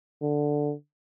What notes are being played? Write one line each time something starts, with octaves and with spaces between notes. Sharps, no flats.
D3